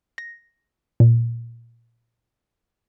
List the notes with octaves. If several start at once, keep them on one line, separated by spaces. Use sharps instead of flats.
A#6
A#2